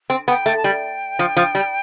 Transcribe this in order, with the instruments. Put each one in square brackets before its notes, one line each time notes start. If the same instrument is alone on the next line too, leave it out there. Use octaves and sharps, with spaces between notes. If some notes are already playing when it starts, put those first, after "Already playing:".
[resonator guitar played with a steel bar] C4
[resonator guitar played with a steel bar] B3 [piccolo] G5
[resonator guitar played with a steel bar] A3
[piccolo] A5
[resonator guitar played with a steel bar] G3 [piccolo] G5
[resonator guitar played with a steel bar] F3
F3
G3